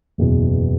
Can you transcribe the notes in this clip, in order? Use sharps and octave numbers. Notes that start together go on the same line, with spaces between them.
F#1 E2 B2